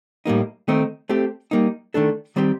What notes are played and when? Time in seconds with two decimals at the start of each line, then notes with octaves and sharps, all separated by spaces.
0.25 A2 G3 A#3 D#4
0.68 D#3 A3 C4 D#4
1.09 A3 C4 G4
1.51 G3 A#3 D#4
1.94 D#3 A3 D4 A4
2.36 D#3 G3 C4 G4